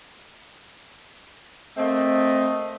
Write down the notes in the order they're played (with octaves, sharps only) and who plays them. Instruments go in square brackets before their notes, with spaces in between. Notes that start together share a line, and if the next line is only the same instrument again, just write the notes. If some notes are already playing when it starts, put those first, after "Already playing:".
[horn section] A3 A#3 C4 [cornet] D#5